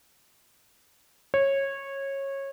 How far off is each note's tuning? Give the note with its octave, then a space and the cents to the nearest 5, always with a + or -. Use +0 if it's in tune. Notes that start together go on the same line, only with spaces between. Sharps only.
C#5 -20